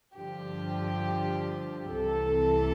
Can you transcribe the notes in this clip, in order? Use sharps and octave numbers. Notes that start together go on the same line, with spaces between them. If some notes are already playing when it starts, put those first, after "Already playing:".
G2 D3 F3 G4
C2 C3 E3 A4